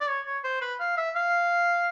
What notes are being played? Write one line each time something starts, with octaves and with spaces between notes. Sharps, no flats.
D5
C#5
C#5
C5
B4
F5
E5
F5